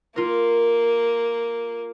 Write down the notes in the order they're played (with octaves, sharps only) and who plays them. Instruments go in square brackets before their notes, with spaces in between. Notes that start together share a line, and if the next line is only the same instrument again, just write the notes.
[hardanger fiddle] A#3 [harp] F4 A#4